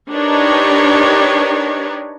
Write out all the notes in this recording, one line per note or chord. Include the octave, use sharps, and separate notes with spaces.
D4 D#4 G4 A#4 B4 C#5